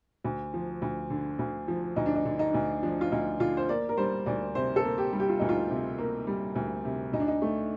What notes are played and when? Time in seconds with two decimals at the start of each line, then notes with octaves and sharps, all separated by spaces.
0.24 D2
0.54 F3
0.82 D2
1.10 D3
1.39 D2
1.68 F3
1.96 D2 D#4
2.06 D4
2.15 D#4
2.25 D3
2.39 D#4
2.54 D2
2.83 F3 D4
3.01 F4
3.12 D2 D#4
3.40 D3 F4
3.57 C5
3.69 A#3 D5
3.89 A#4
3.97 G3 C5
4.26 D2 D5
4.55 C3 C5
4.76 A4
4.84 A#3
4.98 G4
5.13 G3
5.20 G4
5.29 F4
5.39 D2 D#4
5.49 F4
5.70 C3
5.98 A#3
6.27 G3
6.55 D2
6.85 C3
7.13 D2 D#4
7.20 D4
7.28 D#4
7.42 A3